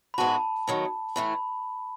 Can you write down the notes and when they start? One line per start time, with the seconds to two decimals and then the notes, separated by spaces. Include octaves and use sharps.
0.14 B5
0.18 G#2 E3 G#3 B3 F#4 A5
0.67 D#3 F#3 B3
1.16 A2 E3 A3 B5